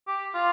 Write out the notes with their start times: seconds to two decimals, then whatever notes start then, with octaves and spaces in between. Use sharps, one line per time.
0.08 G4
0.34 F4